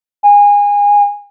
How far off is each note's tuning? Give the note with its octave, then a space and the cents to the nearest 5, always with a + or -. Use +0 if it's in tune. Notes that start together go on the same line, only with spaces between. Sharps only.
G#5 -25